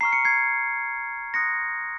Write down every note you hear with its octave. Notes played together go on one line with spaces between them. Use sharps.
A#5 C#6 F6 C7
C#7
G#6 C7
C6 D#6 F#6 A#6 C#7